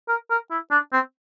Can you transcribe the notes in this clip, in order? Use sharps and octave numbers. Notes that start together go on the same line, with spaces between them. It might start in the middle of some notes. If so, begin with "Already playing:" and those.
A#4
A#4
E4
D4
C4